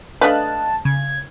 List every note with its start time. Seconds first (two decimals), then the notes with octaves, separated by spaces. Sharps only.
0.21 A3 D4 B4 D#5 F5 A5 F#6
0.85 C#3 G#6